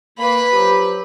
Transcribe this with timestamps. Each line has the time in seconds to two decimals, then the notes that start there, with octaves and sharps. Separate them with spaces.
0.18 A#3 B4 B5
0.53 F3 F#3 G4